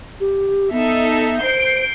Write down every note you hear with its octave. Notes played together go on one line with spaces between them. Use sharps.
G4
B3 D#4 A4 E5
C5 G6 C7 D7